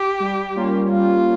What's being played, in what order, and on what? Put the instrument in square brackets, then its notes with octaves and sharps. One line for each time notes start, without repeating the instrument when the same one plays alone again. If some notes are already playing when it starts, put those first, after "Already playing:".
Already playing: [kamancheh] G4
[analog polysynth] G3
A#3 C#4 F4
[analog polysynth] G3 [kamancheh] F4